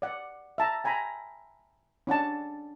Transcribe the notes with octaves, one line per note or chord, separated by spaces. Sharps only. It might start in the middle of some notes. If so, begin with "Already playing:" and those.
D5 F#5
E5 A5 A#5
G5 G#5 A#5 B5
C#4 D4 F#5 A5